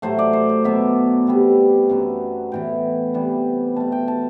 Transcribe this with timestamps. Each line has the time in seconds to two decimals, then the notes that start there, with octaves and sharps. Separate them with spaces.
0.02 A2 F#3 A3 C5
0.19 D5
0.33 C5
0.49 C5
0.65 B2 F#3 B3 E5
1.27 C3 G3 B3
1.89 F#2 F#3 B3
2.52 A2 E3 B3 G5
3.14 C3 E3 G3 B3
3.76 B2 A3 A5
3.92 G5
4.08 A5